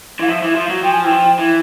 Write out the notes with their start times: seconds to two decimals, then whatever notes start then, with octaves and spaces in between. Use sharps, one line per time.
0.19 E3 F5
0.27 F3 E5
0.42 E3 E5
0.55 F3
0.65 F5
0.69 F#3
0.83 F3 G5
0.92 G#5
1.03 E3 G5
1.11 F3
1.39 E3